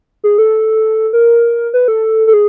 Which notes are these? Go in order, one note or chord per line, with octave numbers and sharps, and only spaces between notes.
G#4
A4
A#4
B4
A4
A4
G#4